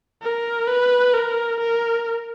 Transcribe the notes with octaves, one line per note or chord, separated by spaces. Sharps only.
A#4
B4
A#4
A#4